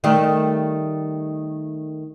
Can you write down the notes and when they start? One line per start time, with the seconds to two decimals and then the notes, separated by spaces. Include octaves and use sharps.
0.04 D#3 G3 A3